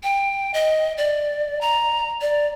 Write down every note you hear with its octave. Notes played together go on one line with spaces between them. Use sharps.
G5
D#5
D5
A#5
D5